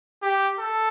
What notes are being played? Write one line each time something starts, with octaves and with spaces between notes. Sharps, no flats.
G4
A4